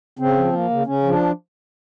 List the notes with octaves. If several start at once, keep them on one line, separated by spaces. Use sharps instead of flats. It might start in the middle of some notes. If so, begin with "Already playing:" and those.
C#3 C4
F3
A#3
C#3
C#3 C#4
F3
D4